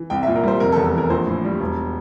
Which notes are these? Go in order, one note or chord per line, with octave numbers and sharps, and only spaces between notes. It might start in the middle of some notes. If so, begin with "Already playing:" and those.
Already playing: E3
C2 G5
A#2 E5
A#4
G3 C5
F1 A#4
A4
E2
A4
E3 A#4
A#1 C5
A2
G3
E1